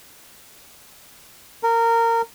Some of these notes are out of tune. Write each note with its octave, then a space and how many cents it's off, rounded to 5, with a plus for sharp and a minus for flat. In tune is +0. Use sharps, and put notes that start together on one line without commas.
A#4 -20